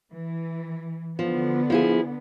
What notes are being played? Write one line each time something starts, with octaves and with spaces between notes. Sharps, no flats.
E3
D3 F3 B3
F3 E4 G#4